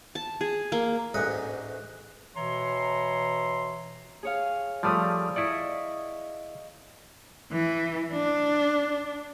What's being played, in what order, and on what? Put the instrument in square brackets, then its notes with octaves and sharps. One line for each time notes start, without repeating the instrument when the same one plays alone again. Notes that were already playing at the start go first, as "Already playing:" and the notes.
[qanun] A5
G#4
A#3
[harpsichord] A1 D2 G#2 F#5 D#6
[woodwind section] B2 E3 C#5 E5 A#5 C6
[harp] G#4 C#5 F5
[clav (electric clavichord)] F3 G3 A3 [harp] D5 D#6 F6
[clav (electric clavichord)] E4 D5 [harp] D#5 C#6
[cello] E3
D4